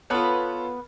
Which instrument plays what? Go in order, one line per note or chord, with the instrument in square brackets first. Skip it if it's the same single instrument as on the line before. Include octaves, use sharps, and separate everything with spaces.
[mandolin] B3 B4 [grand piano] F4 A4 C#5